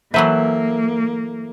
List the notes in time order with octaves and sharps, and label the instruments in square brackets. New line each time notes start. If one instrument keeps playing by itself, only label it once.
[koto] E3 F#3 B4 [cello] A#3 [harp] A4 C5 E5